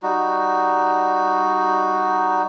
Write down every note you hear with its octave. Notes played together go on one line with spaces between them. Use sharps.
G3 D#4 F#4